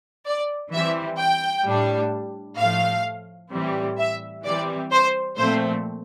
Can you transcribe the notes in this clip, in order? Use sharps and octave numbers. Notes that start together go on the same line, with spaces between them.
D5
E3 G3 C4 E5
G5
A2 G3 D4
A2 F3 A3 F5
A2 E3 G3 C4
E5
E3 G3 C4 D5
C5
A#2 F3 A3 C4 C5